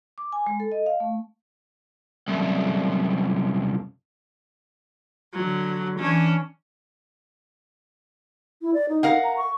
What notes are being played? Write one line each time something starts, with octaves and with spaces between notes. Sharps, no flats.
D6
G#5
G#3
A4
D#5
F5
A3
C2 F#2
D3 F#3
E3 C#4 D4
E4
D5
D#4
A#4 F5 F#5
A#5
C#6